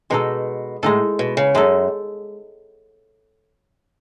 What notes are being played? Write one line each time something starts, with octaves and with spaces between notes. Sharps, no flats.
B2 G#3 D#4 A4
A2 G#3 D#4 A4
B2
C#3
F#2 G#3 D#4 A4